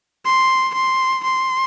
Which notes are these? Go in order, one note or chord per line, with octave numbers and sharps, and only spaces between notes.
C6
C6
C6